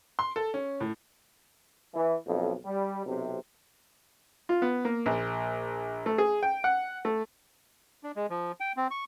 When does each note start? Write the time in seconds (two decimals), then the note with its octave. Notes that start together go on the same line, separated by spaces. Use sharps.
0.19 C6
0.36 A4
0.54 C#4
0.80 A2
1.94 E3
2.27 B1 F2
2.66 G3
3.05 B1 C3
4.49 F4
4.62 B3
4.85 A#3
5.06 A#1
6.06 A3
6.18 G#4
6.43 G5
6.64 F#5
7.05 A3
8.04 D4
8.16 G#3
8.30 F3
8.60 G5
8.77 C4
8.91 C#6